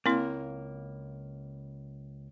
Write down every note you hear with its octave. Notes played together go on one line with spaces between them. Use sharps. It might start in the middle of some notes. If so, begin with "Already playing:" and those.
C#2 A#3 C4 E4